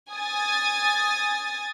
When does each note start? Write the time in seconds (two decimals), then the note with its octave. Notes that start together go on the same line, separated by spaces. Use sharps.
0.12 G#5 D#6 A6